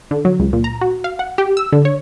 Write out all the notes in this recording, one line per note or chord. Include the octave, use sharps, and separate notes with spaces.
D3
F#3
C#2
A#2
A#5
F#4
F5
F#5
G4
E6
D3
C#5